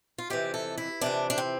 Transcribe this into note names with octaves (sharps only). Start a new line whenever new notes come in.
F4
F2 C3 E3 G4
A4
E4
F2 C3 E3 D4
D4
C4